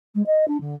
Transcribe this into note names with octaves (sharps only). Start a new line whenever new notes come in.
G#3
D#5
D4
D3